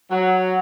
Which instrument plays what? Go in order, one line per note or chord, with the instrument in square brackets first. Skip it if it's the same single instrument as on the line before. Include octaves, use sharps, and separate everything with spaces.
[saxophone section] F#3